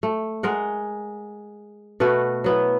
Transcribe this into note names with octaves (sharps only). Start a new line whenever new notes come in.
A3
G#3 A#4 F#5
B2 A3 F#4 B4
F#3 B3 E4